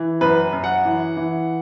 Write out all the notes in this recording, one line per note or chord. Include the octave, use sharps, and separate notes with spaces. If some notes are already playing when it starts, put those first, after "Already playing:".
Already playing: E3
F#2 B4
F#2
F#5
E3
E3